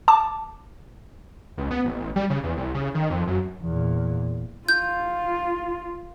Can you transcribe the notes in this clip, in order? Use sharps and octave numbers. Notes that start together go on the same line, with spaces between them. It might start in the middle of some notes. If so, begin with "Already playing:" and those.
A5 D6
C#2
B3
A1
A1
G3
C#3
E2
C2
C#3
D#3
F2
F#2
E2 A#2
F4 G6